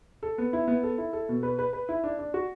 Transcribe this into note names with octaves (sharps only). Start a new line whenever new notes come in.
A4
B3
E4
B3
A4
E4
A4
B2
B4
B4
B4
E4
D4
D4
F#4